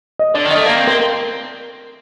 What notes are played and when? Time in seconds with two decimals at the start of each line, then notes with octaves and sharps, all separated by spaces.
0.19 D#5
0.34 D3 D5
0.46 D#3
0.51 D#5
0.56 A3
0.66 A#3 F5
0.77 C4
0.87 C4 A#4